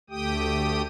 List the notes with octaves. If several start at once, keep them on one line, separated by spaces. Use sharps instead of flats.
D2 A3 G4 G5 D#6